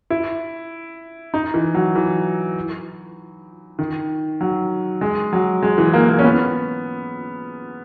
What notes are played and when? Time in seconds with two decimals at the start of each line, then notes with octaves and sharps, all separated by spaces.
0.10 E4
1.34 D#4
1.54 E3
1.75 F#3
1.96 E3
3.79 D#3
4.41 F#3
5.01 G#3
5.33 F#3
5.63 G#3
5.78 E3
5.93 A#3
6.09 A#3
6.19 C#4
6.24 B3